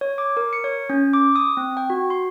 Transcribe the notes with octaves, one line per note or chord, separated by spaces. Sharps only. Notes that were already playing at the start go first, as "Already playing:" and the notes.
C#5
D6
A#4
C#7
C#5
C#4
D6
D#6
C4
G5
F#4
C6